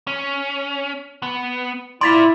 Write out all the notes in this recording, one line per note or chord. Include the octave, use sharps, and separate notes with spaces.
C#4
B3
E4 F4 D5 C6 A6 B6